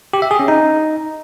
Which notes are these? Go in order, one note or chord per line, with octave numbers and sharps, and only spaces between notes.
G4
E5
G#4
C#4
D#4